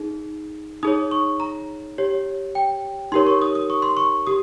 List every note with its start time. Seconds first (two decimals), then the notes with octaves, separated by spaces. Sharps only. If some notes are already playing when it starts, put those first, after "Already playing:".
Already playing: D#4 G#4
0.83 D#4 G#4 C#5 D#6
1.11 C#6
1.40 A#5
1.98 G4 C#5
2.55 G5
3.12 D#4 G4 A#4 C#5 C6
3.27 C#6
3.42 D#6
3.55 D#6
3.70 C#6
3.82 C6
3.97 C#6
4.27 G4 D#6